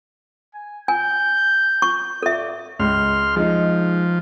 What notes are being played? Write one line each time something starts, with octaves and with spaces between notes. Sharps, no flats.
G#5
G#5 G6
C#6
A4 D5 E5
C#2 C6 F6
F3 G#3 D#4